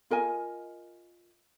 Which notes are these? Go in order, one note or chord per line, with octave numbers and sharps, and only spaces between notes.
F4 A#4 D#5 G#5